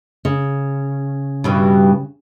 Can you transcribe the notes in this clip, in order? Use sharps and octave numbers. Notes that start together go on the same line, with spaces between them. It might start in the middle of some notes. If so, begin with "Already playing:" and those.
C#3
G2 B2 E3